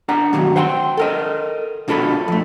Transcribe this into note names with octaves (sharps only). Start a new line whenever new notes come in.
D4 F#5 A#5
G2 B2 D#3 F3 F#3
C5 F#5 G5 A#5 C6
A4 A#4 D#5
B2 D4 F4 A4 B5
F2 A3